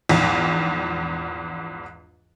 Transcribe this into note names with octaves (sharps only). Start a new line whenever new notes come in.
A#1 E2 G#2